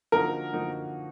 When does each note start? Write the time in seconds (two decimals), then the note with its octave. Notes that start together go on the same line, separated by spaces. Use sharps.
0.12 D3 F3 A#3 D#4 F#4 A#4
0.53 D3 F3 A#3 D#4 F#4